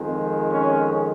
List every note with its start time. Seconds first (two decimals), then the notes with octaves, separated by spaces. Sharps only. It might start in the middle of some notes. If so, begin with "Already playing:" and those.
Already playing: F2 D#3 G#3
0.49 C#4